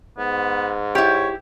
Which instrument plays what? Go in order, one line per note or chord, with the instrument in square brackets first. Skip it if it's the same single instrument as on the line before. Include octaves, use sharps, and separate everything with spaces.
[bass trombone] G#2 [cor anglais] B3
[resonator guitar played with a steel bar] E4 G4 [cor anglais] C#5